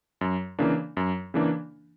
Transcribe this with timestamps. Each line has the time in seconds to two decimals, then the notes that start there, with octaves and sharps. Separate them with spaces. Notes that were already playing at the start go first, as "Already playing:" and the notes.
0.21 F#2
0.59 C#3 E3 A#3 D4
0.97 F#2
1.34 C#3 E3 A#3 D4